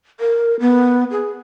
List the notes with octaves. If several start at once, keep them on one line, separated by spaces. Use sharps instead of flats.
A#4
B3
G#4